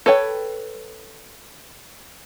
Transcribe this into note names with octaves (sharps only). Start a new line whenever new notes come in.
A4 B4 C#5 G5